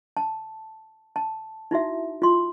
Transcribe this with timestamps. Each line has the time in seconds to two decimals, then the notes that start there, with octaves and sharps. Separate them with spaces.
0.17 A5
1.16 A5
1.71 D#4 E4 F#4 E5
2.22 F4 C6